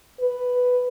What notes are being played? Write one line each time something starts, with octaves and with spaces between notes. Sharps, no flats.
B4